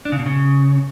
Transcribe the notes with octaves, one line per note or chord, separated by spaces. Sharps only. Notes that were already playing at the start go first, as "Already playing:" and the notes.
D4
C#3
B2
C#3